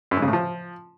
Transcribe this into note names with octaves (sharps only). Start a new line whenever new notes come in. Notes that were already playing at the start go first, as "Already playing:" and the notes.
F#2
G#2
C#3
A2
F3